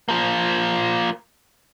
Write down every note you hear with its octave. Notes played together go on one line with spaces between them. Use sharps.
F3 A#3